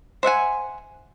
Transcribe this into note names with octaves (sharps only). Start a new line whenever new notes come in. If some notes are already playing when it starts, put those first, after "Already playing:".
C5 E5 F#5 G#5